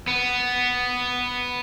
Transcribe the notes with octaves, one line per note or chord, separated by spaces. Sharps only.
B3